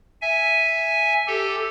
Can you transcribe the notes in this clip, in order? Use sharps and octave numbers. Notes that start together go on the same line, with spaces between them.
E5 G#5
G4 A4